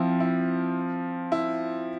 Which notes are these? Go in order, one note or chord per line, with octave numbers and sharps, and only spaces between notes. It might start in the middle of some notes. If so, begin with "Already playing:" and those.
Already playing: F3 C4 E4 F4
E4
E4